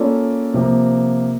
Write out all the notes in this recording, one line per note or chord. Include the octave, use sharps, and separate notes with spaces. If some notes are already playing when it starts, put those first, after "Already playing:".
Already playing: A#3 C#4 F4 A4 D5
C3 F3 A#3